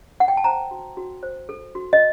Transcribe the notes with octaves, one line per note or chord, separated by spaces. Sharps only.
F#5
G5
A5
C5 A#5
F#4
F#4
C5
A4
F#4
D#5